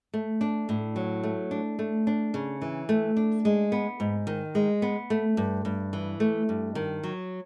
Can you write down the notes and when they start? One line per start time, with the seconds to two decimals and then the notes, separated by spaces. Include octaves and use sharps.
0.14 A3
0.41 D4
0.69 A2
0.96 F#3
1.24 A3
1.51 D4
1.79 A3
2.07 D4
2.34 C#3
2.62 E3
2.89 A3
3.17 D4
3.45 G#3
3.72 B3
4.00 G#2
4.27 D#3
4.55 G#3
4.82 B3
5.10 A3
5.37 G2
5.65 G2
5.93 E3
6.20 A3
6.49 G2
6.75 D#3
7.03 F#3